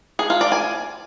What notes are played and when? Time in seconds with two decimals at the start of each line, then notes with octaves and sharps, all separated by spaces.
0.19 G#4
0.30 F4
0.41 D5
0.52 G#5